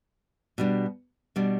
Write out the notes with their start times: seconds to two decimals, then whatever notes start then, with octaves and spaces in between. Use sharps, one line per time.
0.58 B2 G3 D4
1.36 B2 G3 D4